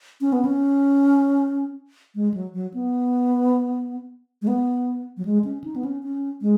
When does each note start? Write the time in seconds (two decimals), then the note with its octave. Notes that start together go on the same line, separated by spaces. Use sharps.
0.21 C#4
0.32 B3
0.45 C#4
2.15 G#3
2.34 F#3
2.53 F#3
2.74 B3
4.42 G#3
4.47 B3
5.17 F#3
5.25 G#3
5.45 C#4
5.64 D#4
5.76 B3
5.85 C#4
6.03 C#4
6.42 G#3